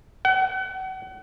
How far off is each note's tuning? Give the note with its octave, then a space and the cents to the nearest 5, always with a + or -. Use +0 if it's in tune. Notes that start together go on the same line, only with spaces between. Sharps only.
F#5 +35